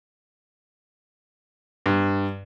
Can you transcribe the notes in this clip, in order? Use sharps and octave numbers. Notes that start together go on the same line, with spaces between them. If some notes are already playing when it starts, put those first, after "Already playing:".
G2